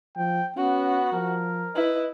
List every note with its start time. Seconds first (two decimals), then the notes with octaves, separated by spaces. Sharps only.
0.17 F3 G5
0.56 B3 C#4 F#4
1.13 F3 A#4
1.75 E4 B4 D#5